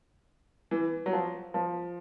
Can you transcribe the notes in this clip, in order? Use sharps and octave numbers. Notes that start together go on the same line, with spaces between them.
E3
F#3
F3
F3